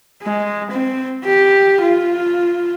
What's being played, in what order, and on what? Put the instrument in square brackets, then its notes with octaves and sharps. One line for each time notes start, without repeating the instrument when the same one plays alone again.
[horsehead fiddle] G#3
C4
G4
F4